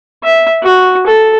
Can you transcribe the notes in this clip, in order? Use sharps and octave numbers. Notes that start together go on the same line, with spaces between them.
E5
F#4
A4